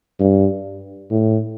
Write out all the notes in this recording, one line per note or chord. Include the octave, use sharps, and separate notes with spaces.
G2
A2